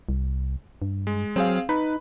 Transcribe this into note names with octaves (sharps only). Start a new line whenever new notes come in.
C2
G2
G#3
F#3 C4 G#4 F5
D#4 B4 B5